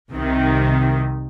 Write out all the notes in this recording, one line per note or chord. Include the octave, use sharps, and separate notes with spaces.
C2 C3 D#3